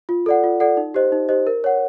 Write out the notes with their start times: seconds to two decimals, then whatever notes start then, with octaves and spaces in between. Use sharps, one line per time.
0.09 F4
0.26 A4 D5 F#5
0.44 F4
0.60 A4 D5 F#5
0.77 D#4
0.94 G4 C5 D#5
1.12 D#4
1.29 G4 C5 D#5
1.47 A#4
1.64 C#5 F#5